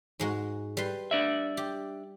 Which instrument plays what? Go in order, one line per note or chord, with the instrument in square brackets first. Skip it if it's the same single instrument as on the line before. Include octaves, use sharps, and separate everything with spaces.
[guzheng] G#2 G#3 F#4
G3 B4 C6
[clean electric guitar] D4 D5 E5
[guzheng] G4